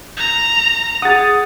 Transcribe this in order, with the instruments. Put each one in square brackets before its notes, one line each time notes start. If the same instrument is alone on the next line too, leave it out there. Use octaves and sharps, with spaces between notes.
[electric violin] A#5
[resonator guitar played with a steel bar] G#4 F#5 [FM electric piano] D#6 A6